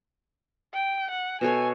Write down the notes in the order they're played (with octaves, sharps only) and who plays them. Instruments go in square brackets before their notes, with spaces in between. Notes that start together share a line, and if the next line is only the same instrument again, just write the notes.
[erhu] G5
F#5
[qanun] B2 A4 C#5 [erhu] G#5